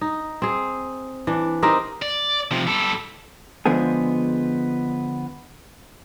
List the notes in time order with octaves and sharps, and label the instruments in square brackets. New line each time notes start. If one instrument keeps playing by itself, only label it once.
[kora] D#4
C4 G#4
E3 D4
C4 D#4 G4 A#4
[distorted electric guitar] D5
C3 F3
G3 A4
[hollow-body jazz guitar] D3 F3 G#3 B3 G#4